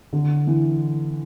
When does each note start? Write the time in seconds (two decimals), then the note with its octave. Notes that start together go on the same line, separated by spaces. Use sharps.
0.13 D3
0.47 E3